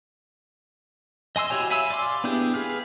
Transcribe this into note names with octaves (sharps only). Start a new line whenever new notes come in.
D#5 G#5 C6 E6
E4 F#4 G4 C#5 G#5
E5 F5 G#5 B5 E6
D5 F5 C6 D6
B3 D4 E4 G4 G#4
G#4 B4 F5